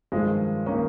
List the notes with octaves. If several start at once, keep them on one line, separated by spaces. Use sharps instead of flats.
G2 D#3 F3 G#3
D#3 A#3 C#4